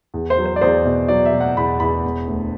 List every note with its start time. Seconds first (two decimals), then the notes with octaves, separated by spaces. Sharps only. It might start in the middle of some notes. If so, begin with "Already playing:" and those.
0.14 E2
0.30 C5
0.38 F#3
0.45 C5
0.56 D5
0.61 E2 C5
0.85 B2
1.08 F#3 D5
1.25 E5
1.33 B2
1.40 F#5
1.57 E2 B5
1.80 E2 B5
2.05 E1
2.28 D2